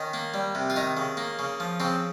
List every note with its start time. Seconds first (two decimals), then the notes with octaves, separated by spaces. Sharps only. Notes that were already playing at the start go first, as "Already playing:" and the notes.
Already playing: D#3 C#4
0.14 A#3
0.34 G3
0.55 C3
0.70 F4
0.76 D#3 D#4
0.97 C#3
1.17 A#3
1.39 C#3
1.60 F3
1.80 C#3 C4